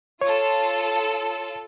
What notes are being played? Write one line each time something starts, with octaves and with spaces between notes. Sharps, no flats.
F4 A4 C#5